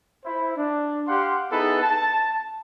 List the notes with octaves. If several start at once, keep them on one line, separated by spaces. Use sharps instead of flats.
E4 C5
D4
G4 F5 F#5 C6
B3 D#4 E4 G#4 A4 B4
A5